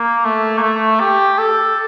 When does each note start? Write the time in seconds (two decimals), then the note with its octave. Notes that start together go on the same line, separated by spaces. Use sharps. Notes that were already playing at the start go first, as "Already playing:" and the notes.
Already playing: A#3
0.25 A3
0.58 A#3
0.62 A3
1.00 G4
1.38 A4